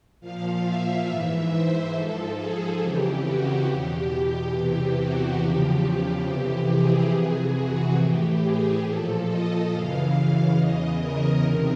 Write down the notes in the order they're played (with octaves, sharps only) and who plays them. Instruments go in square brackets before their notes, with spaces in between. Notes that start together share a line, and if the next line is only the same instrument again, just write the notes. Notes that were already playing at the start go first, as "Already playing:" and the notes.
[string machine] A#2 F3 F5
E5
G#2 E3 E5
C5
G#2 F3 A4
G#4
F2 C#3 E3 G4
F#4
E2 B2 G4
G4
E2 C3 E3 G4
F#4
E2 C#3 F3 G4
F2 C3 E3
G#4
F2 C3 E3
F#4
A2 E3 G4
G#4
A#2 F3 A4
D#5
F#2 C#3 E3 F5
F5
E2 C#3 E3 D#5
A#4
F2 C3 D#3